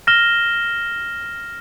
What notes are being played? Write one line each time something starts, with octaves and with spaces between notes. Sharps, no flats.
F6 A#6 E7 G7